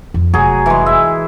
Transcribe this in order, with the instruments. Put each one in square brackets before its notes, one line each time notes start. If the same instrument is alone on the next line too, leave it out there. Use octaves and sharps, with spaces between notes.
[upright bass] F2
[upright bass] F1 [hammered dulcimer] F#3 G#4
[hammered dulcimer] E3 G#3
E5